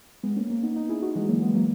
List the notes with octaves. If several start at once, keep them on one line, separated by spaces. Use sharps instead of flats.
G#3 B3
A#3 C#4
A#3 C#4
B3 D#4
B3 D#4
E4 G#4
D#4 F#4
E3 G#3
F#3 A#3
G#3 B3
F#3 A#3